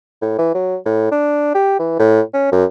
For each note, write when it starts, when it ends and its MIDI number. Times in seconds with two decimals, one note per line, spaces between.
0.22 0.34 45
0.38 0.53 52
0.54 0.76 54
0.86 1.09 45
1.11 1.53 62
1.54 1.77 67
1.79 1.98 52
1.99 2.21 45
2.34 2.51 61
2.52 2.65 42